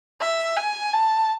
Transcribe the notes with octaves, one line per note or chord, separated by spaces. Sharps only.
E5
G#5
A5